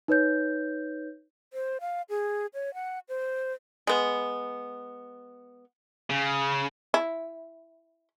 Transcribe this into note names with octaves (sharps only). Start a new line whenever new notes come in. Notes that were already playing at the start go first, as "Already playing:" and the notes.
D#4 B4 C#5 G6
C5
F5
G#4
C#5
F#5
C5
G#3 B3
C#3
E4